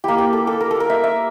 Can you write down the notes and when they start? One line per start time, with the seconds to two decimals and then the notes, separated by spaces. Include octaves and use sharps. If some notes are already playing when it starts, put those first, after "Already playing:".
0.04 A#3 E4 G4
0.18 G4
0.33 A4
0.47 A4
0.61 A#4
0.71 A4
0.80 A#4
0.90 E5
1.03 E5